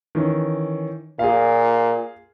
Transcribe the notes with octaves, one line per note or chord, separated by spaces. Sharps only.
D#3 E3 C#4
A#2 G#4 F5